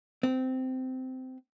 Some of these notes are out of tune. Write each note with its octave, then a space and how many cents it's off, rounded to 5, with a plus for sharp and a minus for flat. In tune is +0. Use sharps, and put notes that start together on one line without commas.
C4 -15